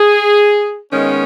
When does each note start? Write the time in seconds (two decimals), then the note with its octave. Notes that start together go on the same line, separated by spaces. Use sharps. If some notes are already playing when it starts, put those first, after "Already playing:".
Already playing: G#4
0.92 D#3 G#3 B3 C#4